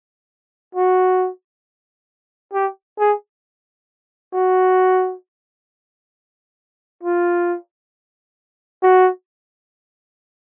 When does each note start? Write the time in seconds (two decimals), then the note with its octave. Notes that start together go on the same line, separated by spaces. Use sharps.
0.75 F#4
2.54 G4
2.99 G#4
4.33 F#4
7.03 F4
8.82 F#4